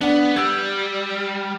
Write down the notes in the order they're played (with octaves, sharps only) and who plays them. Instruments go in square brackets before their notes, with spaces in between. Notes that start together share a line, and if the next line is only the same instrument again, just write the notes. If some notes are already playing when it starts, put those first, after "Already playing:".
[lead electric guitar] B3 [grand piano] D4 F#5
[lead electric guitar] G3 [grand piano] E6 G#6